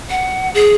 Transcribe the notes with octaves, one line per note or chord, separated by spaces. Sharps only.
F#5
G#4